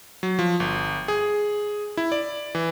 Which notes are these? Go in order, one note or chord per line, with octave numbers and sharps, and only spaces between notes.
F#3
F3
G1
G#4
E4
D5
E3